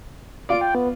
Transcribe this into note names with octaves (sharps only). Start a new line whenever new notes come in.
F4 D5 D7
G5
B3